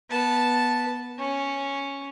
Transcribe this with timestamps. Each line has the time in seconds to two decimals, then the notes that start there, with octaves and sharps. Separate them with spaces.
0.10 B3 A5
1.19 C#4